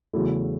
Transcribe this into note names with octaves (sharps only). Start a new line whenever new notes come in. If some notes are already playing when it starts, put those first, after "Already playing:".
E2 C#3 F#3 A3 E4